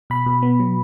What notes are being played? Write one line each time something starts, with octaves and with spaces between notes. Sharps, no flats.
B2 B5
B2
B3
F#3